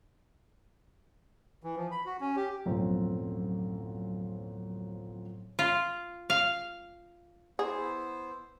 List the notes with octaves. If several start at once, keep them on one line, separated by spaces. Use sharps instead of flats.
E3
F3
B5
F#4
C#4
G4
D1 F#2 B2 F3 C4
F4
F5
B3 E4 G#4 C5